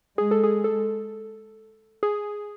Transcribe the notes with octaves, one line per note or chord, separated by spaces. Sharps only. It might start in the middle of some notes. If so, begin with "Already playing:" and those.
G#3 G#4
A4
G#4
A4
G#4